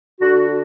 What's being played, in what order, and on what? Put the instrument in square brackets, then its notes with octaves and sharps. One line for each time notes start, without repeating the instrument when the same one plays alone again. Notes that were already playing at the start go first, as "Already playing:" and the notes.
[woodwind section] D3 F#4